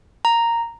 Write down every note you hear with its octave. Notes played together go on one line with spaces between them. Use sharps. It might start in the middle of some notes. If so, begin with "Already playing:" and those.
A#5